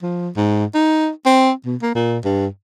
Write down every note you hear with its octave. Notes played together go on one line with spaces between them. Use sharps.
F3
G#2
D#4
C4
B2
A#3
A#2
G2